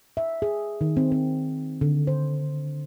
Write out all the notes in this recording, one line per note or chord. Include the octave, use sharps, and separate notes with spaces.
E5
G#4
D#3
C4
C4
D3
C5